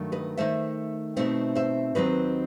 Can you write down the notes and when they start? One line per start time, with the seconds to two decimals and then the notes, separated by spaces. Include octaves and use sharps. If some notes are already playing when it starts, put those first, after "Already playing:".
Already playing: G2 D#3 F#3 A3
0.12 B4 D#5
0.37 D#3 F#3 A3 C5 E5
1.16 B2 A3 C4 D#4 C5 E5
1.55 C5 E5
1.95 D#2 D#3 F#3 C4 B4 D#5